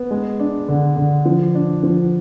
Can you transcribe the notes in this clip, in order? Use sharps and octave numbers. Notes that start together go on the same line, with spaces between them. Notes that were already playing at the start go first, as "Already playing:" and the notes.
Already playing: B3
G#3
D4
D3
D3
F3
D4
F3